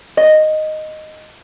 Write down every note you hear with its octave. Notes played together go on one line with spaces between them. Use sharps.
D#5